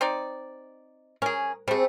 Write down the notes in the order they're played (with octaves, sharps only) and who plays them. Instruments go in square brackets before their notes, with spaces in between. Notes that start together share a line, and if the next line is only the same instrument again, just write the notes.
[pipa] C4 D#4 D5
[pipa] C#4 G#4 [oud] A#4
[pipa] G3 A3 [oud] C4 G#4